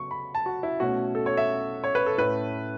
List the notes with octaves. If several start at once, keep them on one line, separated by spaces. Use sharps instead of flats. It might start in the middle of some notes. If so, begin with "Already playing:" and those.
Already playing: C#3 F#3 B3 C#6
B5
A5
F#4
E4
B2 A3 C#4 F#4
A4
C#5
E5
C#5
B4
A4
A2 A3 C#4 B4